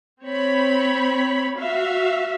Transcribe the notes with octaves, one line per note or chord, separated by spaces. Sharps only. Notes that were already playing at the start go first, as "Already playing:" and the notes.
C4 C#5 B5
F#4 E5 F5